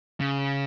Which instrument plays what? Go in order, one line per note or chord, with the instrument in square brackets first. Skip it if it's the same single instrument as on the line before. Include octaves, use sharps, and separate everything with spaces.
[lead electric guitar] C#3